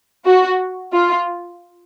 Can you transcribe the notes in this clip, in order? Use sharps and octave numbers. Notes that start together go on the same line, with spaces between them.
F#4
F4